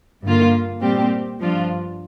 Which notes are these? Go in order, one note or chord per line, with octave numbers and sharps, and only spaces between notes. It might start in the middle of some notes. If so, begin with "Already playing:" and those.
G2 D3 A#3 F4
A#2 G3 C4 G4
G2 F3 D4 F4